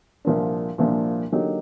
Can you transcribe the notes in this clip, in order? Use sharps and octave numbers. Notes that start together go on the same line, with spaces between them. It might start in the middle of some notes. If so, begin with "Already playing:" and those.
C2 A#2 F3 A#3 D4
C2 A#2 F3 A#3 D4
D3 F#3 A#3 D#4 G4